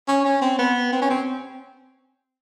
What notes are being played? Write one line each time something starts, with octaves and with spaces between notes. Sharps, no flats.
C#4
C#4
C4
B3
C4
C#4
C4